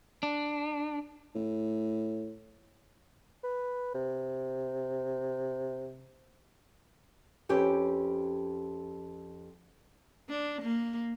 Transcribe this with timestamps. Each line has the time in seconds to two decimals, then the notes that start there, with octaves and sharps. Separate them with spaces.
0.23 D4
1.35 A2
3.43 B4
3.94 C3
7.49 F2 C#4 G4 B4
10.30 D4
10.62 A#3